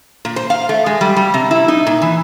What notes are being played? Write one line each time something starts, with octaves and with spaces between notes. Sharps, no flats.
A#2
C5
F5
A3
G#3
G3
G3
C3
E4
D#4
A#2
E3